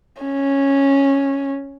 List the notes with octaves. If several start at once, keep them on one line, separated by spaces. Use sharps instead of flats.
C#4